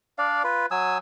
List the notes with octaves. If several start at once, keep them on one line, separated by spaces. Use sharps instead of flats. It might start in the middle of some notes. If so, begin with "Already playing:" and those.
D4 D5 F5
F4 B4
F#3 G#5 D#6 E6